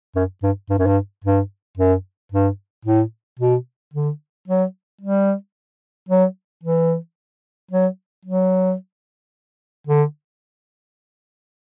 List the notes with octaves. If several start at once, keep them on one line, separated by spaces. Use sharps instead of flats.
F#2
G2
G2
F#2
G2
G2
F#2
G2
A2
B2
D3
F#3
G3
F#3
E3
F#3
F#3
D3